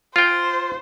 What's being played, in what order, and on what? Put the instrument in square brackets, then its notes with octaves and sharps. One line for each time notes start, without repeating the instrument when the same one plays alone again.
[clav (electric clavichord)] F4 G5 [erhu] C5